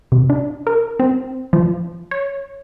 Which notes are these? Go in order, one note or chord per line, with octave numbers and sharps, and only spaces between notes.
C3
D4
A#4
C4
F3
C#5